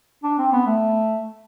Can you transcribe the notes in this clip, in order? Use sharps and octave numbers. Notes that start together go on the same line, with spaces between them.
D4
C4
B3
A3